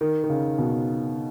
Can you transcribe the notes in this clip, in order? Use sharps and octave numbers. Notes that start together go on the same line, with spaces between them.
D#3
D#3
C#3
B2